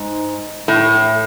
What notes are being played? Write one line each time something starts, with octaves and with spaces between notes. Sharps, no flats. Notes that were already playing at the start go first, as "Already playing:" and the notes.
Already playing: G#2
A2